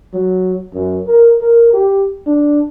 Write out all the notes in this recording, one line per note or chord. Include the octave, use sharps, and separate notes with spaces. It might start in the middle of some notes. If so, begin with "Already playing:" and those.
F#3
F#2
A#4
A#4
G4
D4